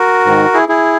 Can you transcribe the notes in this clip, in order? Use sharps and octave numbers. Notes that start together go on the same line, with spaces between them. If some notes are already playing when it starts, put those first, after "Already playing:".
Already playing: F#4 A#4
G#2 D#3
E4 G#4
E4 G#4